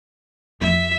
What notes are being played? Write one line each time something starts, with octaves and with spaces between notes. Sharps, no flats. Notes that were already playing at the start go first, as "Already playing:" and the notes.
F2 F3 E5 B6